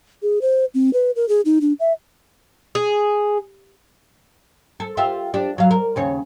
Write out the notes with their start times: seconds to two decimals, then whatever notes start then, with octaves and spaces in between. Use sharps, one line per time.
0.22 G#4
0.41 C5
0.74 C4
0.93 B4
1.16 A#4
1.29 G#4
1.45 D#4
1.61 D4
1.80 E5
2.75 G#4
4.80 A4
4.97 F4 G4 E5
5.34 D4 G4
5.58 F#3 F5
5.71 A#4
5.96 D#2 C#3 C#5